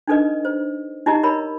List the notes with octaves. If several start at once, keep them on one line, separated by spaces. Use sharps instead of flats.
D4 D#4 A4 B4 D#5
C5
D#4 E4 G4 D#5 A#5
A#4 C#5 B5